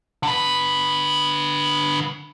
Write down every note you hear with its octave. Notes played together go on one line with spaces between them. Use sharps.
D3 B4